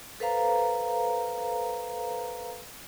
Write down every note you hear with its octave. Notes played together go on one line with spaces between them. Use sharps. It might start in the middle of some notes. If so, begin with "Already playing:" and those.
A4 B4 C5 F5 A#5